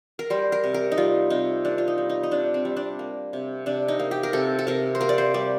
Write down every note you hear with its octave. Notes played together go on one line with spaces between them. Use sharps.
A#4
G3 C5
A#4
C3
A#4
D#4
G3 F4
C3 D#4
A#3 D4
F4
D#4
G3
D#4
D#4
C3 D4
C4
G3
D4
A#3
C3
C3 D4
D#4
A#3
G4
A#4
C3 A4
A4
C3 A#4
C5
A#3 A#4
D5
C5
G3 D5